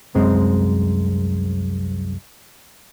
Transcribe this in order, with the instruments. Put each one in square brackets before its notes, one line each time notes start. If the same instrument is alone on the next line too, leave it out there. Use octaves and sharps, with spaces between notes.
[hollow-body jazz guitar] C2 F#2 G#3 C4